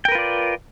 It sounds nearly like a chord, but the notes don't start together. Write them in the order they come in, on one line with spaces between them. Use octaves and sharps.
G5 A#4 B4 F4 D5